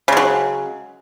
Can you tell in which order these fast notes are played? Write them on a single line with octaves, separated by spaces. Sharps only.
C#3 G#3 F#3